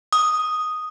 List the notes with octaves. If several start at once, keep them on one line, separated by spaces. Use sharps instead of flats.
D#6